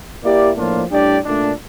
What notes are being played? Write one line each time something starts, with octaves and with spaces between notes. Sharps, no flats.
A#3 E4 G4 D5
A2 F3 A#3 D4 F4
A2 G3 D4 G4 D5
A#2 A3 D4